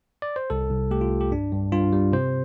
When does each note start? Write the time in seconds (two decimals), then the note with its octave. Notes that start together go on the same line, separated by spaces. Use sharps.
0.22 D5
0.36 C5
0.50 C2 A4
0.71 C2
0.91 A3 G4
1.01 F4
1.11 C2
1.21 G4
1.32 G2 D4
1.52 G2
1.72 G2 F4
1.93 G3
2.12 C3 C5